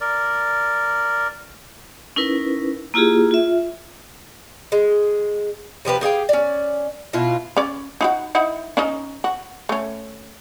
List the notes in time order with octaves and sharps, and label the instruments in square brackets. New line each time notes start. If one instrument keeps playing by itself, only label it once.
[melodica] A#4 D5
[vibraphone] C#4 D#4 E4 A#4 B4
A#3 E4 F4 G4 G#4
F4 E5
[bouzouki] G#3
C3 F3 G4 B4
G4 G#4 F5 G5
C#4 D5
B2 E4 F4
[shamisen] C#4 D5
D#4 E4 F#4
D#4 E4 F#5
C#4 D#4 D#5
F#4
A3 C#4